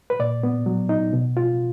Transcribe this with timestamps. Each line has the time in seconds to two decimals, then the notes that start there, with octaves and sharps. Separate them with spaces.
0.10 B4
0.19 A#2 D5
0.43 B3
0.66 F#3
0.89 D#4
1.13 B2
1.37 F4